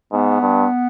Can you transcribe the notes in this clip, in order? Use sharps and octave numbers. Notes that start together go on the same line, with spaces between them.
G#2 B3
G2